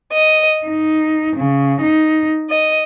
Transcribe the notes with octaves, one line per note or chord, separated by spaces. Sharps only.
D#5
D#4
C#3
D#4
D#5